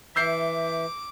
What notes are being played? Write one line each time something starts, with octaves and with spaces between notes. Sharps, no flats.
E3 E5 D6 E6 G6 C7